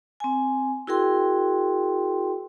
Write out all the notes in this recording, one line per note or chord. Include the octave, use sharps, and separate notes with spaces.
C4 G#5
E4 F#4 G#4 A#4 G5 C6